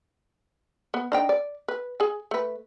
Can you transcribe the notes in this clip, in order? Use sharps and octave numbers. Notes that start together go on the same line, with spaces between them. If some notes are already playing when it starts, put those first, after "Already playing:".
B3
D4 D#4 G5
D5
B4
G#4 G#5
A3 B4